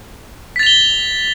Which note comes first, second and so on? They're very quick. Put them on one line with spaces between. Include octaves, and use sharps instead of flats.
B6 A6 F7 G7